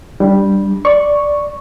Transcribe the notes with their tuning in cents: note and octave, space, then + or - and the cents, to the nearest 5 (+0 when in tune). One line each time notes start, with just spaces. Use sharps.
G3 +0 D4 +0
D5 +0 C#6 +0